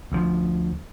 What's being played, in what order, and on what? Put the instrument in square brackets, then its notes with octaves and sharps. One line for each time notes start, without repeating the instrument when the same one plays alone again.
[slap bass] D2 F3